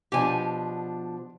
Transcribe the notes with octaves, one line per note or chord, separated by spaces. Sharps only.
B2 F3 D4 G4 G#5